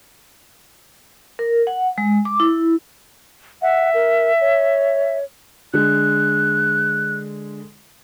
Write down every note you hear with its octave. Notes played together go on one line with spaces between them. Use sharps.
A#4
F#5
G#3
D6
E4
E5 F#5
A#4
C#5
D3 G#3 F#6